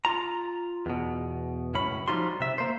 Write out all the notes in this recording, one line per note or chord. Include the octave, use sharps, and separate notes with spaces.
F4 A#5
E2 B2
C#2 F#2 A2 C#4 B5
F3 G3 D#4 F4 F#4 C6
C3 E5
A#3 C5